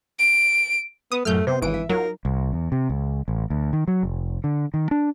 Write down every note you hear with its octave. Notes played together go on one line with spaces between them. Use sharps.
D7
B3 D#6
F#2 A2 F#3 A3 F6 G6
C3 B3 C5
G#1 E3 D7
E5
F#3 D#4 F4 A#4
C2
E2
C3
C#2
A1
D2
D#3
F#3
F1
D3
D#3
D4